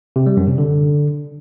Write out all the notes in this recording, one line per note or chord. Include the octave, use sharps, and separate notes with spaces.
C3
G3
F#2
C3
D3